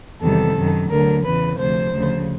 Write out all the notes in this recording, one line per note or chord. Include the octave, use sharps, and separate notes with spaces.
E2 C3 D#3 G3 A4
F#2 D#3 F#3
D2 D3 F#3 A#4
E2 C#3 E3 B4
D2 C3 F3 C5
D2 C#3 F3